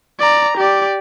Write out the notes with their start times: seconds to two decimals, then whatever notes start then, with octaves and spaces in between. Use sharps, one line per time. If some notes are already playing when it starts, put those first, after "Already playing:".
0.19 D5 A#5
0.58 G4 D5